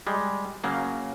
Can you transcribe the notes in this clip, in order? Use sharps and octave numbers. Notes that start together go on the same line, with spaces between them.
G3 G#3
C#3 F#3 A#3